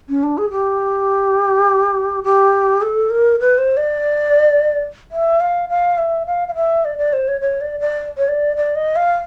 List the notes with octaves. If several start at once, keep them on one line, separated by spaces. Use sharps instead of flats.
C#4
D4
G#4
G4
G4
A4
A#4
B4
C5
D5
E5
F5
F5
E5
F5
F5
E5
D5
D5
C5
C#5
C#5
D5
D5
C#5
D5
D5
D#5
F5